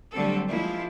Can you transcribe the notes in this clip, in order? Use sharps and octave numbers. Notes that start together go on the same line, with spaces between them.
D3 F#3 G3 A3 C4 A4
F3 G#3 A#3 E4